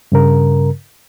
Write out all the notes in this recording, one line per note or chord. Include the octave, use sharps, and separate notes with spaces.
G2 C#3 A#4